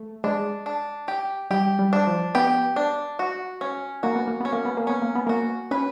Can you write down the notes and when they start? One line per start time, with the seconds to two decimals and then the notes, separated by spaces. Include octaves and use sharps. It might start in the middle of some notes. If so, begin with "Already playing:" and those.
Already playing: A3
0.24 G#3 D4
0.66 D4
1.08 G4
1.51 G3 G4
1.79 G3
1.93 D4
2.07 F3
2.35 B3 G4
2.76 D4
3.19 F#4
3.61 C#4
4.03 A#3 F#4
4.16 B3
4.28 A#3
4.40 B3 C#4
4.53 A#3
4.65 B3
4.77 A#3
4.87 B3 C#4
5.02 A#3
5.15 B3
5.27 A#3 F#4
5.71 C#4 B4